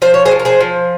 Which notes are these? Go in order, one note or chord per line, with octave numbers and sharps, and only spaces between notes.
F3 C5
C#5
G#4 C5
F3
A#4
G#4 C5
F3